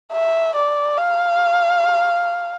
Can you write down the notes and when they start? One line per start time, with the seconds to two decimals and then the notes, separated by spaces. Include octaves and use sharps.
0.12 E5
0.56 D5
0.98 F5